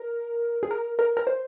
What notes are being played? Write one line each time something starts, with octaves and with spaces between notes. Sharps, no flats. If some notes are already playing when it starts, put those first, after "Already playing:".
Already playing: A#4
G#4
A#4
A#4
A#4
C5